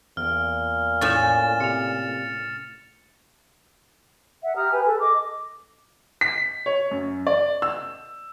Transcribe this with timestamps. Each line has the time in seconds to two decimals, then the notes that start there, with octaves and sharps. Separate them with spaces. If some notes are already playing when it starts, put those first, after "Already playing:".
0.17 E2 A#2 F6
1.01 A2 C#4 A6 E7
1.60 C3 C#7 F7
4.42 E5 F#5
4.55 G4 A#5 D#6 F6
4.71 G4 B4 G#5
4.86 G#4 A4
4.99 D#5 D6
6.21 B6
6.66 C#5
6.91 F#2
7.27 D5
7.62 E6